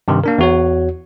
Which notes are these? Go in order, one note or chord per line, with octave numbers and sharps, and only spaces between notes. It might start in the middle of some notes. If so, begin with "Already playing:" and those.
G2 C3 D#3
A#3 D4 A#4
E2 F#4 C#5